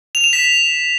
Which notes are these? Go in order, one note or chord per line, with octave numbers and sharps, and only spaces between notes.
F7
E7
B6